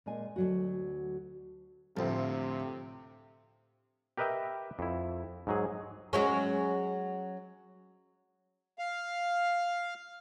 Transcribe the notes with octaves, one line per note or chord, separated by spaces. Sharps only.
A#2 G#3 G#5
D2 F#3 F#4
A1 D2 C3 F3 A3 C4
G4 A#4 B4 D#5 E5 G5
F2 E4
G#2 F#3 G#4
F#3 G#3 C#4
F5